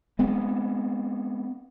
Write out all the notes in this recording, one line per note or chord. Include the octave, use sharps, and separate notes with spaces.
G#3 B3 C4